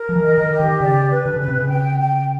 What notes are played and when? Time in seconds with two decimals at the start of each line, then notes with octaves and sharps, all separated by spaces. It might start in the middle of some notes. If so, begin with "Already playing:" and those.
Already playing: A#4
0.09 F3
0.16 E3
0.23 D#5
0.38 D#3
0.51 G4
0.60 D#3
0.81 C#3 D5
1.11 B4
1.26 D3
1.36 C#3 B4
1.48 C3
1.60 C#3
1.69 G5
1.99 G5